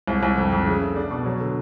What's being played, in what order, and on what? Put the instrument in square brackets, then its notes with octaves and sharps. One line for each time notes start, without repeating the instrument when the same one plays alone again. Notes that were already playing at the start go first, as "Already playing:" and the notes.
[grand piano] C2
C2
F2
F2
C#3
A3
D4
B2
F#3
D3